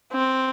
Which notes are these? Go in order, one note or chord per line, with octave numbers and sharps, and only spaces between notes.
C4